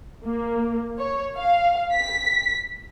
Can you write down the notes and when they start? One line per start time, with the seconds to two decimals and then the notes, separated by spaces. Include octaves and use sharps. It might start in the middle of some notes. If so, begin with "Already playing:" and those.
0.23 A#3
0.99 C#5
1.37 F5
1.95 B6